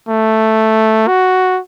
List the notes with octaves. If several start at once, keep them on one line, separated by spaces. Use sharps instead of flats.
A3
F#4